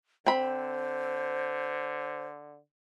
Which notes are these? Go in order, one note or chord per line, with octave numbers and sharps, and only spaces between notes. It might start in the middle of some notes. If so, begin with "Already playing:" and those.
D3 C4 C5 B5